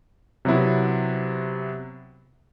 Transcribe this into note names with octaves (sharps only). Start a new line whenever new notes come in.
C3 F#3 B3 E4